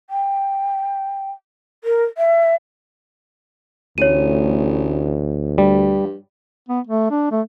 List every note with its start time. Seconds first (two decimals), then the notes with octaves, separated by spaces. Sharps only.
0.10 G5
1.84 A#4
2.18 E5
3.98 A1 D2 C#5 D#7
5.58 G2 G3
6.69 B3
6.87 A3
7.10 D4
7.32 A3